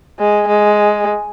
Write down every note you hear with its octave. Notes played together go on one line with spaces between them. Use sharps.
G#3
G#3